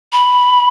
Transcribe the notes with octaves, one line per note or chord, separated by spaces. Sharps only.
B5